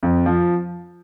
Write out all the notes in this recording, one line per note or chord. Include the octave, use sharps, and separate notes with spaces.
F2
F3